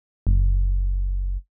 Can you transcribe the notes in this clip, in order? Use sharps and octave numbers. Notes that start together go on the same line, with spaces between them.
F#1